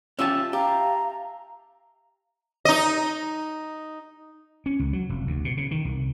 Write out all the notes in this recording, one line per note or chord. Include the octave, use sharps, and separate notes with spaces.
C#4 F4 G4 E5 A5
G4 F5 A#5
D#4 D#5
C#4
C#2
F#3
F1
D2
B2
C#3
D#3
C2